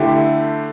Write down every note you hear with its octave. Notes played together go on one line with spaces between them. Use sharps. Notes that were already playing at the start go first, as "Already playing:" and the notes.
Already playing: D3 A3 E4 G4